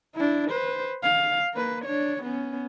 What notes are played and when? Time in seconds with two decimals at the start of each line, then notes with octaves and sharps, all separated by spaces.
0.15 D4 E4
0.51 B4 C5
1.03 F5
1.54 A#3 B4
1.85 D4 C#5
2.23 B3 C#4